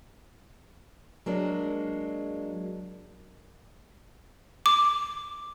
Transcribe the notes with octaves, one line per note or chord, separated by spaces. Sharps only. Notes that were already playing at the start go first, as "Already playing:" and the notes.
F#3 G#3 A#3 D4
D6